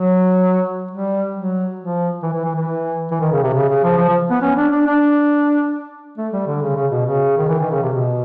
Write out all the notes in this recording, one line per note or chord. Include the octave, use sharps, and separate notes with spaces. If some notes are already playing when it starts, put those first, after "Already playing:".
Already playing: F#3
G3
F#3
F3
E3
E3
E3
E3
E3
D#3
C#3
C3
C#3
C#3
F3
F3
F3
B3
C#4
D4
D4
D4
A3
G3
D3
C#3
C#3
B2
C#3
D#3
E3
D#3
C#3
C3
B2